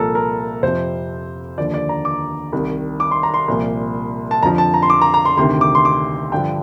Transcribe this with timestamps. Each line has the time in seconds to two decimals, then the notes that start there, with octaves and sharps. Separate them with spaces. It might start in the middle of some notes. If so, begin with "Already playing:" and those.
Already playing: C2 A#2 F3 A4 A#4
0.15 A#4
0.63 F2 C3 F3 C5
1.58 D#2 D3 F3 D5
1.74 D5
1.89 A#5
2.05 D6
2.52 C2 C3 D#3
3.00 D6
3.11 C6
3.23 A#5
3.34 C6
3.48 C2 A#2 F3
4.31 A5
4.43 F2 D3 F3 A#5
4.58 A5
4.74 A#5
4.82 C6
4.90 D6
5.02 A#5
5.14 A#5
5.25 C6
5.37 D2 C3 D#3 C6
5.61 D6
5.75 C6
5.85 D6
6.32 G2 D3 F3 G5